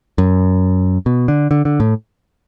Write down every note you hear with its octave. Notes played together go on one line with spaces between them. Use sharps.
F#2
B2
D3
D3
D3
A2